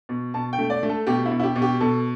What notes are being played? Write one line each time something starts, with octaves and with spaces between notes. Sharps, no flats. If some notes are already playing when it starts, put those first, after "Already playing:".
B2
B2 A5
G5
A3
D5
A3
A4
B2 G4
E4
B2
E4
G4
B2
G4
B2 A4